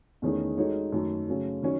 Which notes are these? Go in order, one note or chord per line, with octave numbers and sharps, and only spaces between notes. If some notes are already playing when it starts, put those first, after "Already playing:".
E2 D#3 A3 C#4 G#4
G#3 D#4 F#4 A4 C#5
F#2 D#3 A3
C#3 F#3 A3 C#4
D#3 F#3 C#4